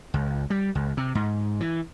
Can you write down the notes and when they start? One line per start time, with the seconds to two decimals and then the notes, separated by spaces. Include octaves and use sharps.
0.14 C#2
0.50 G3
0.75 C#2
0.97 C3
1.15 G#2
1.60 E3